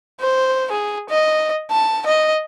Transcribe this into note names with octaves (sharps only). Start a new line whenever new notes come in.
C5
G#4
D#5
A5
D#5